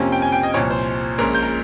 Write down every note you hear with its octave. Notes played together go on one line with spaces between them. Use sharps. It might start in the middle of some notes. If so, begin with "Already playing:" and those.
Already playing: F2 C3 F3 A#3 C#4 G#5
G5
G#5
G5
D#5
C2 A#2 F3 C#5
C5
A#1 A#2 G#3 C#4 A#4
G6
A#5